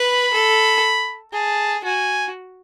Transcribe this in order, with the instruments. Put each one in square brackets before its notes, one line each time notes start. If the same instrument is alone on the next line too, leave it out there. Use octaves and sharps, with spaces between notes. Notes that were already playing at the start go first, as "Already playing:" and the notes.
Already playing: [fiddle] B4 [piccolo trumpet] B5
[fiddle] A4
[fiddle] G#4 [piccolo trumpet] A5
[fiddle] F#4 [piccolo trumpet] G#5